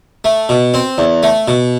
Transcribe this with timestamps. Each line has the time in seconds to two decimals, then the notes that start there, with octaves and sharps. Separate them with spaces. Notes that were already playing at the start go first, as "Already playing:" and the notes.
0.24 A3
0.49 B2
0.74 C4
0.98 E2
1.23 A3
1.48 B2